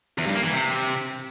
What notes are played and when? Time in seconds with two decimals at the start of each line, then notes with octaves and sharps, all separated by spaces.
0.18 E2
0.26 G2
0.35 A#3
0.43 E3
0.52 C3